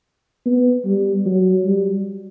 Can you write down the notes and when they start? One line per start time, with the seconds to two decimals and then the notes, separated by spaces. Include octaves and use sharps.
0.46 B3
0.85 G3
1.26 F#3
1.65 G3